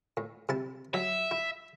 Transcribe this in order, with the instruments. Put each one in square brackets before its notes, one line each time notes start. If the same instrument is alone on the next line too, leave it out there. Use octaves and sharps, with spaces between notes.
[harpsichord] A2
C3 E4 A5
[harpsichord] F#3 [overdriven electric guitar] E5
[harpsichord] E4